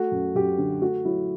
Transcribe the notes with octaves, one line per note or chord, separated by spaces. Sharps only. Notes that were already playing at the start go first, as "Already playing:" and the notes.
Already playing: A3 F#4
F#2
F#2 G4
D3
A3 F#4
F#3 E4